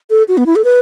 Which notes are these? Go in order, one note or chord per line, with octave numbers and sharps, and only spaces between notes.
A4
F#4
B3
E4
A4
B4